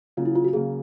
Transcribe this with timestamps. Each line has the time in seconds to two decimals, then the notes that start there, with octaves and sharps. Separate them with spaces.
0.17 C#3 F#3 A#3 F4
0.25 E4
0.35 F4
0.44 F#4
0.53 C#3 F#3 A#3 G#4